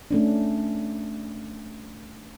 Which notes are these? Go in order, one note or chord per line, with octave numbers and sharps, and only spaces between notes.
A3 C#4 D4